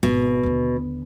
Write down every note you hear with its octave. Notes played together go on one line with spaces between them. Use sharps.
G#1 B2
D#2 D3